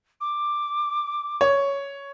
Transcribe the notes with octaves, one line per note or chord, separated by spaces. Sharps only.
D6
C#5